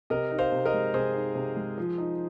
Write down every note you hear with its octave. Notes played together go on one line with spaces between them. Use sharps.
C3 A#4 D#5
D#4
C5 F5
C3
A#4 D#5
G#3
C3 G#4 C5
D#4
C3
G#3
F3
D#4